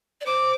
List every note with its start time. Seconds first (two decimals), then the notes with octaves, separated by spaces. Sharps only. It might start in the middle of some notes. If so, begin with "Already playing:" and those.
0.21 D5
0.26 C5 D6